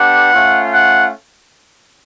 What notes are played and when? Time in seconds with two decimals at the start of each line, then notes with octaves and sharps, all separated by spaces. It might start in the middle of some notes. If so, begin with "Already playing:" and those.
Already playing: B3 D4 G4 F#5
0.33 A3 C#4 F4
0.71 F#5